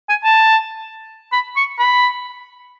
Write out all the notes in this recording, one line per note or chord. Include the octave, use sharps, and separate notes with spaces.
G#5
A5
B5
C#6
B5